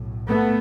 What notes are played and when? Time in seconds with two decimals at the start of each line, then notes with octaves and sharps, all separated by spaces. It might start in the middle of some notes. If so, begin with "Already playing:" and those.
Already playing: B1 A2
0.28 A3 B3